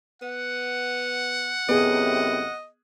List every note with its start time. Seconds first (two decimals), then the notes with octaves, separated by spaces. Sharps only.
0.22 B3 F#5
1.69 F#2 A2 C3 B3 G#4 D#5